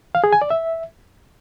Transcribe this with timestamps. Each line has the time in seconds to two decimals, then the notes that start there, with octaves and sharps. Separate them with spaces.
0.15 F5
0.24 G#4
0.33 G#5
0.42 D5
0.50 E5